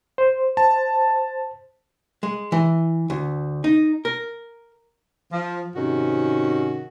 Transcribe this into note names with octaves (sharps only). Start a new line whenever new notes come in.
C5
A5
G#3
E3
D2
D#4
A#4
F3
G#2 C3 D#3 C#4 F#4 G#4